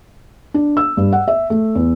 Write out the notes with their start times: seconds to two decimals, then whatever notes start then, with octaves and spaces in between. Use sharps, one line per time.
0.54 D4
0.77 E6
0.97 G2
1.13 F#5
1.28 E5
1.50 A3
1.75 E2